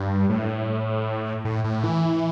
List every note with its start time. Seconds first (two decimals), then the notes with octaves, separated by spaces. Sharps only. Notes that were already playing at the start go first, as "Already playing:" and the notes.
Already playing: G2
0.30 A2
1.45 A2
1.64 A2
1.84 E3